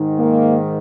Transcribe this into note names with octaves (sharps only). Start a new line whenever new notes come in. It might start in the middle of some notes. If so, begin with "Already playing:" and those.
Already playing: G#2 D#3
A#3